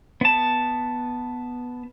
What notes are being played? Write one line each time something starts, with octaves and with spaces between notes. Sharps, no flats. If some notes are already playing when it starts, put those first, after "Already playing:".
B3 A5